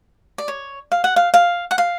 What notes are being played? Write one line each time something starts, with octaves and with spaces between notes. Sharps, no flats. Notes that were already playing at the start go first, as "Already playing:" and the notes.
D5
C#5
F5
F#5
F5
F5
F#5
F5